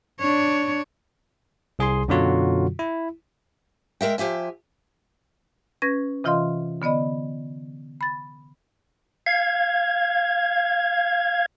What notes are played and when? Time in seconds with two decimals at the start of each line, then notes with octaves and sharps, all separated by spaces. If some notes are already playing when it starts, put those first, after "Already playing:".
0.20 D4 C#5
1.79 C2 G#4 G#5 C6
2.08 F#2 B2 D3 F#3 F4 F#4
2.79 E4
4.01 G#3 A#4 E5 G5
4.18 F3 G4 E5 G#5
5.82 C#4 B4 G#6 A#6
6.24 C3 E3 F4 D#5 F5 C6
6.82 D3 B3 D5 D#5 B5
8.01 B5 A6
9.26 F5 G#6